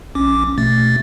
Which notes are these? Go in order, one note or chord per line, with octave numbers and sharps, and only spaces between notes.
A#1 C#4 D6
B2 A3 A6